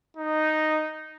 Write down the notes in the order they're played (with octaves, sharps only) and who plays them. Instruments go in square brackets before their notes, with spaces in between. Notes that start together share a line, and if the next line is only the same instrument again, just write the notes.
[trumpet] D#4